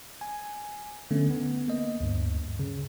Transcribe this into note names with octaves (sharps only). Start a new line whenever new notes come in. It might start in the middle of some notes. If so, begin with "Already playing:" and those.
G#5
D3 A3 B3 C#4
B3
A#3 D#5
D2 G2
C#3